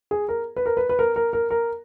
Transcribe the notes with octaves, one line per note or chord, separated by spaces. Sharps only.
G#4
A#4
B4
A#4
B4
B4
A#4
A#4
A#4
A#4